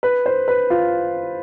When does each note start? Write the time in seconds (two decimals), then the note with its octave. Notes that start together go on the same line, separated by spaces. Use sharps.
0.03 B4
0.26 C5
0.48 B4
0.70 F4